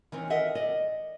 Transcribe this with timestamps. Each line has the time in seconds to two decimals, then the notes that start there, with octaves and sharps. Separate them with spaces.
0.12 D#3 E3 C4 C#4
0.30 A#4 D#5 E5 F#5
0.55 D5 D#5